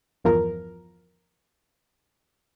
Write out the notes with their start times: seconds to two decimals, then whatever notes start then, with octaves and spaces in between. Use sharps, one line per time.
0.24 G1 E2 F3 A#4